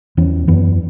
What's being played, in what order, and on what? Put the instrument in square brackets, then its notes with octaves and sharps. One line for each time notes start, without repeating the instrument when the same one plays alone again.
[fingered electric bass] E2 E3 C#4
F#2 E3 B3